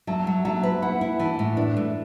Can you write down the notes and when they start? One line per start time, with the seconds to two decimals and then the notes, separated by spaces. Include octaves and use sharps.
0.07 F#3 E5 A5
0.27 F#3
0.45 F#3 E5 A5
0.63 B4
0.82 E4 F#5 B5
1.01 E4
1.19 E3 E5 A5
1.39 A2
1.57 D4 B4 E5
1.77 A3